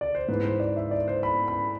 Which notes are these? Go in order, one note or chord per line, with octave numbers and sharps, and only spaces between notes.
D5
C5
G#2 E3 B3 B4
C5
D5
E5
D5
C5
B5
B5